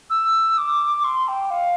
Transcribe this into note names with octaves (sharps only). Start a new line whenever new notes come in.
E6
D6
C6
G5
F5